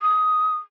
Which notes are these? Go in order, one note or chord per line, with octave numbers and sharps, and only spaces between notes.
D#6